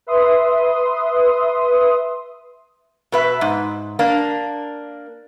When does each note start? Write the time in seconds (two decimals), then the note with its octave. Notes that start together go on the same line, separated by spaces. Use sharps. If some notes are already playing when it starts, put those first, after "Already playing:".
0.07 B4 E5 C6 D#6
3.12 B2 B4 E5
3.41 G#2
3.99 A#3 D4